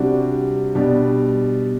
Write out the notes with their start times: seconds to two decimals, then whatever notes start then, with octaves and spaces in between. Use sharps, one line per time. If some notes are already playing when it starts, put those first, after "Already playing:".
Already playing: C3 G3 D4 F#4
0.75 B2 G3 D4